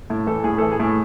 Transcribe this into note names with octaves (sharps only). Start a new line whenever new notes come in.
A2
E3 A4
A2 G#4
E3 A4
G#4
A2